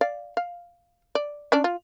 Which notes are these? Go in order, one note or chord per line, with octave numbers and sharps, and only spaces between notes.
D5 F5
F5
D5
C#4 D4 D5
F4